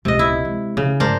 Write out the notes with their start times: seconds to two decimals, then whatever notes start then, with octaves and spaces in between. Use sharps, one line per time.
0.05 D#1 C#2 C3 D#5
0.19 E4 E5
0.45 G#3
0.77 C#3 C#4
1.00 G2 D4 A#4 C5